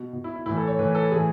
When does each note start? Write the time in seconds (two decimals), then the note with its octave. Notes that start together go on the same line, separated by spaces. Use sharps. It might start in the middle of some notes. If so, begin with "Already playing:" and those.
Already playing: B2
0.13 B2
0.24 E4
0.36 E4
0.46 A2 E3 E4
0.57 A4
0.67 C#5
0.78 A2 E3 B4
0.95 A4
1.11 A2 E3 G#4